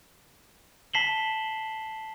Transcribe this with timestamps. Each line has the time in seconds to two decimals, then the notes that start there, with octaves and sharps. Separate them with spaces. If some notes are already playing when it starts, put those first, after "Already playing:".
0.93 A5 B6 C7 E7 F#7 G7